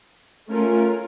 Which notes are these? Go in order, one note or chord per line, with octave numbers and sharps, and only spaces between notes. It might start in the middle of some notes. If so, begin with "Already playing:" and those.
A3 C#4 F4 A#4